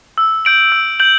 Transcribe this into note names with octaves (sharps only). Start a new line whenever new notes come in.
E6
G6 D7 F#7
E6
G6 D7 F#7